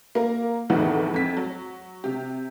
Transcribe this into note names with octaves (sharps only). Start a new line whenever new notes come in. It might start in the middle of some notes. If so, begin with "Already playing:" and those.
A#3 A#4
F1 E2 A2 D#3 E3 F#5
F2 B6
F#3
C3 G4